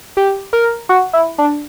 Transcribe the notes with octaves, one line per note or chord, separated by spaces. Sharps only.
G4
A#4
F#4
E4
D4